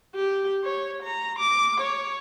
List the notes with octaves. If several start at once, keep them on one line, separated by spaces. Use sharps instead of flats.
G4
C#5
A#5
D6
C#5